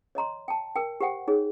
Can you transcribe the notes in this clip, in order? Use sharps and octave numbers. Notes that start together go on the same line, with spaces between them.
C#5 D#5 A#5 C6
G5 A5
A#4 G5
G4 C5 F#5 G5
D#4 G#4 C#5